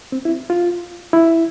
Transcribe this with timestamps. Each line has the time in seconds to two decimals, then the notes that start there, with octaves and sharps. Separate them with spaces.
0.12 C4
0.25 E4
0.50 F4
1.13 E4